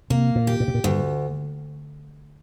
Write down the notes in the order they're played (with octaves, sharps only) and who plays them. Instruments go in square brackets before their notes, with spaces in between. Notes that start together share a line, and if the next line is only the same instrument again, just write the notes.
[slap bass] C3 [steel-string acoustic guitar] A#3
[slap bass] A#2
[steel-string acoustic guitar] G4
[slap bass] A#2
C3
A#2
[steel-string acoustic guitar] D2 [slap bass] G2